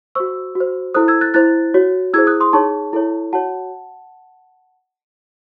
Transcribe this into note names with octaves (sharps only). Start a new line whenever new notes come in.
F#4 C5 C#6 E6
F#4
C5
E4 A4 C5 D#6 F#6
E6 G#6
F#6 A6
E4 C5 F#6 A6
F#4 C#5
E4 G#4 C5 E6 G#6
D#6 F#6
C6 D#6
D#4 G#4 C#5 A5 C#6
E4 A4 C#5
F#4 C#5 F#5 A5